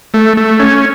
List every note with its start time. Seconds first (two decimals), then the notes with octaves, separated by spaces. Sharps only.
0.14 A3
0.37 A3
0.59 C#4